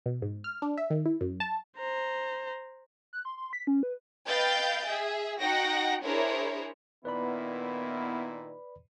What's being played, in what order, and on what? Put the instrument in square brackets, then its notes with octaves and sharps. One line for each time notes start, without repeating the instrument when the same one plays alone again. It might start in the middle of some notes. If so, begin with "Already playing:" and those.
[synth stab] B2
G#2
F6
D4
E5
D#3
E4
F#2
A5
[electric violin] C5 A#5
[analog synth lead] F#6
C6
C6
B6
C#4
B4
[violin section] B4 D#5 F5 G5 G6 A6
G#4 E5
D#4 F#4 F#5 G5 A#6
D4 E4 G#4 A#4 C5 C#5
[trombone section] A#2 D#3 E4 [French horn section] B3 [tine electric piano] B4 D5 B5